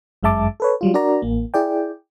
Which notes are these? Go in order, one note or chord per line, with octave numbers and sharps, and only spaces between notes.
G1 F#2 G#3 E5 A5 D6
A4 B4 C#5
F#3 G3 F4
D4 F#4 A#4 D5 A#5
A1 A#3
E4 G#4 D5 G5